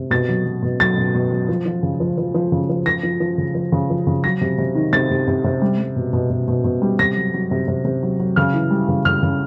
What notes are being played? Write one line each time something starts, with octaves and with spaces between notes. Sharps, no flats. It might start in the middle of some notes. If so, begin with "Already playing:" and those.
Already playing: C3
B2 A6
F#3
F#3
B2
F#3 A6
B2
B2
F#3
F3
F3
C#3
F3
F3
F3
C#3
F3
F3 A#6
F3
F3
C#3
F3
C#3
F3
C#3
F#3 A#6
C3
C3
D#3
C3 A6
C3
C3
C3
G3
G3
B2
B2
B2
B2
B2
G3
C3 A#6
F#3
F#3
C3
C3
C3
F#3
F#3
C#3 F6
E3
G3
C#3
C#3 F6
C#3